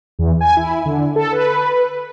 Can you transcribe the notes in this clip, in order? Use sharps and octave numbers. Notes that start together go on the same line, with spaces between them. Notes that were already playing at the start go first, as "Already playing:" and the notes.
E2
G#5
E4
D3
A4
B4